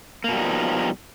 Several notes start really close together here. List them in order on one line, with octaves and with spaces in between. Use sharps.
A#3 B2 G3 D#4 F3